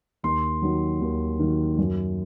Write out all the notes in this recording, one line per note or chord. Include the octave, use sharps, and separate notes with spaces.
D#2 C6
D#3 F#3
D#2
D#3 F#3
F#2